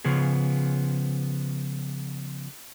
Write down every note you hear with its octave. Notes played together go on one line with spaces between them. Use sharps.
C#3 F3 B3 G#4